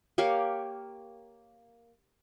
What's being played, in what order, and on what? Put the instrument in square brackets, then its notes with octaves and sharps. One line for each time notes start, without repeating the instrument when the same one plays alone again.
[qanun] A#3 G4 C#5 F5